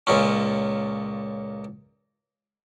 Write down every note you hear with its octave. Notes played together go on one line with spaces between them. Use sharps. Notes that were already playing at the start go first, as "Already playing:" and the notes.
C#2 A#2 C#4